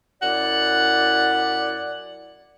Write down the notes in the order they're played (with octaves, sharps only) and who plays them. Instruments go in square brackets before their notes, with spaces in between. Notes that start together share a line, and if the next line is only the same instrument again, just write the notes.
[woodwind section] F#2 E4 D5 [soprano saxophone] F#5